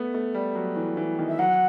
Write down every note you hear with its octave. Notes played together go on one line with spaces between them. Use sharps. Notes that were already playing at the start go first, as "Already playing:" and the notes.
Already playing: A3 B3
A3
G3
F#3
E3
E3
D#3
E5
F#3 F#5